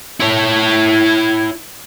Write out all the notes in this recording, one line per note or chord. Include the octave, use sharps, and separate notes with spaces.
E4 C#5